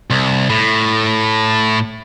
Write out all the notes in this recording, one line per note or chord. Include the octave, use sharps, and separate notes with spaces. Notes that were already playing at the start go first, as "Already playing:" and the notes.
C2
A2